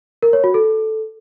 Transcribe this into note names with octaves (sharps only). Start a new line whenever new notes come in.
A#4
C#5
F#4
A4